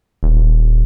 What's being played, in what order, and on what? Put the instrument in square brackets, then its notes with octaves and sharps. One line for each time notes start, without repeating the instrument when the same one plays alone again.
[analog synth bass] D#1